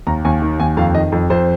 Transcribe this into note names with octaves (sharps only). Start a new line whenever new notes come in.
D#2 A#5
D#2 G#5
D#3
D#2 G#5
F2 F5
D#3 D#5
F2
F2 C5